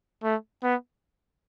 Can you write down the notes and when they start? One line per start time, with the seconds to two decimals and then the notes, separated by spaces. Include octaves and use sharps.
0.24 A3
0.63 B3